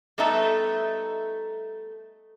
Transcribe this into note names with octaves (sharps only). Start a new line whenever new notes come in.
G3 A3 B3 D#4 A4 E5